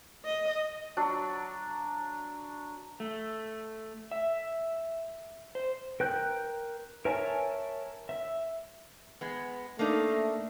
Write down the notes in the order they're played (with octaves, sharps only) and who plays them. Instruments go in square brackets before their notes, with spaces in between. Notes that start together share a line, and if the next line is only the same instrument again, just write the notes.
[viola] D#5
[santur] F#3 D4
[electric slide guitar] A3
E5
C5
[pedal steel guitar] A#4 G5 F#6 G6
A#4 C#5 E5 G#5 A5
E5
[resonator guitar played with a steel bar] G#3 B3
[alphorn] A3 [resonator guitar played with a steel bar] A#3 D4 D#4